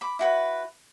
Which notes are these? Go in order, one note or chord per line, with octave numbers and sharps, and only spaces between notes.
B5 D6
E4 F#4 B4